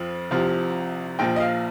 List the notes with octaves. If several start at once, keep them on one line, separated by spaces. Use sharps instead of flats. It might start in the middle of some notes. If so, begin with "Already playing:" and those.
Already playing: F2 F3
C2 C3 F3
A#1 A#2 F3 G5
D#5
F5